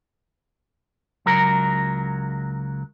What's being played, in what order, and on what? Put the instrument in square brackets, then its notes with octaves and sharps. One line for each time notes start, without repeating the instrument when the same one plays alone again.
[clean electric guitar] C#2 F#3 A#4